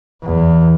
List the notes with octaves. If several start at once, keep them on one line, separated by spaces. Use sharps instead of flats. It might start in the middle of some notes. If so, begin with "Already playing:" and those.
E2